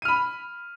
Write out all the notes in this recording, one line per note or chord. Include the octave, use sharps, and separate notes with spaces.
B5 F6 D#7